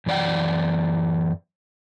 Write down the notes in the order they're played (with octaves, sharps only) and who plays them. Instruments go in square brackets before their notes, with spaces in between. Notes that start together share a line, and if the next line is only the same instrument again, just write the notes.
[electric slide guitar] F#2 E3 D5 F#5 G5